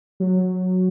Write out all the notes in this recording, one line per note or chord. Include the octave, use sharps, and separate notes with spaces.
F#3